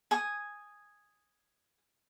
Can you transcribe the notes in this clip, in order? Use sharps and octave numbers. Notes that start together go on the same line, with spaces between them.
G#5 D#6